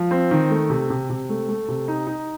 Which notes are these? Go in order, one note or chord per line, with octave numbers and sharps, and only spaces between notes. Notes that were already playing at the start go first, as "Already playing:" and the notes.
Already playing: F3
C4
D#3
A3
C3
C3
C3
A3
A3
C3
D#4
D#4